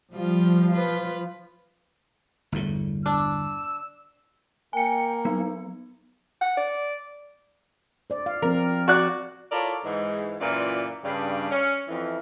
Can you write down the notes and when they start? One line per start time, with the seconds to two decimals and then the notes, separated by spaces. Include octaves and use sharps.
0.14 F3 G3 F4
0.71 F4 B4
2.52 G1 E2 A2
3.06 D4 E6
4.73 A#3 A#4 G5 G#5 C#7
5.25 F#3 B3 D#4
6.41 F#5
6.57 D5
8.10 C5 D5
8.26 F5
8.42 F3 C4 A#4
8.88 F#4 D5 F#6
9.52 E4 F4 A4 A#4 C#5 D5
9.84 G#2 E3 G#3
10.40 F#2 A#2 E3 F4 D5
11.04 G2 C#3 D5
11.50 C#4
11.88 F2 E3